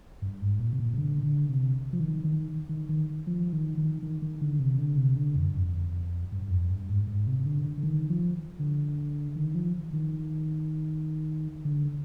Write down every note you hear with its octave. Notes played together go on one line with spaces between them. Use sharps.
G2
G#2
A#2
C3
A#2
C3
D3
D3
C3
F3
D#3
D#3
D#3
D#3
F3
D#3
D#3
D#3
D#3
D3
C3
D3
C3
D3
F2
G2
F2
G2
G2
F2
G2
G#2
G#2
C3
C3
D3
D3
D3
D#3
F3
D3
D#3
F3
D#3
D3